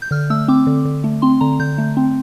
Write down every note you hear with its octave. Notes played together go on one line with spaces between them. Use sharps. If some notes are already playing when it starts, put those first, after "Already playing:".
G6
D3 F6
A3 E6
C4 D6
D3
D3
A3
C4 C6
D3 A#5
D3 G6
A3
C4